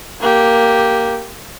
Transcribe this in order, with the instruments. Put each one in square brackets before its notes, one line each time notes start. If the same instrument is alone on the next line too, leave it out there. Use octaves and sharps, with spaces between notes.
[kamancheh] A#3 G4